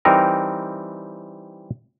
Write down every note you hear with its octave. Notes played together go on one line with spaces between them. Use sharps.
E3 G3 C4 D#4 A#4